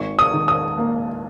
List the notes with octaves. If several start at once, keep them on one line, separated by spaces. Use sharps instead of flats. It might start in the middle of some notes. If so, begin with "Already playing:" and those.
Already playing: G#1 C#6
D#6
D#3
D#6
A#3